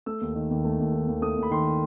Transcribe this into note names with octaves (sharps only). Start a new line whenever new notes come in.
A3 E6
D#2
D#3
D#2
A3
D#2
D#3
D#2
A3 D#6
D#2
B5
D#3 C6